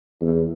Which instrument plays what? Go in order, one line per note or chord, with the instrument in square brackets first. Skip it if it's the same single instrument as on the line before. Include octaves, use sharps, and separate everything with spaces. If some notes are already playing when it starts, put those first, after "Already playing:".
[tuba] E2